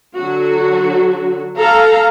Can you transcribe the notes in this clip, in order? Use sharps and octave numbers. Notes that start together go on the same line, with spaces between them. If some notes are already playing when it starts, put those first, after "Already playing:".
D3 F#3 F#4
A4 F5 A#5